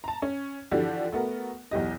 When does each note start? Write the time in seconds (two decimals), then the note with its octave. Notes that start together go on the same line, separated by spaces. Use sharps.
0.04 A5 A#5
0.22 C#4
0.71 D3 E3 F3 D4 F#4 G4
1.12 A3 B3 F#4 A#4
1.71 B1 E2 G4 D#5